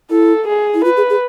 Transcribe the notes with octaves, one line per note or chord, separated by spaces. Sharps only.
E4 A4
G#4
E4
F4 B4
G#4
G#4